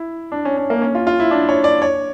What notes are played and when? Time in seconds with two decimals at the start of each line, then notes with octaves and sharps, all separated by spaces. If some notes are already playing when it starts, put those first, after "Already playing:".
Already playing: E4
0.32 D4
0.45 C#4
0.57 C#4
0.70 A#3
0.82 C#4
0.95 F4
1.07 F4
1.20 E4
1.31 D4
1.49 C#5
1.64 D5
1.82 C#5